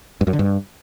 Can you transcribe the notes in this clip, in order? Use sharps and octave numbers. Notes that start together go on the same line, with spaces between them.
G2
F#2
D3
G2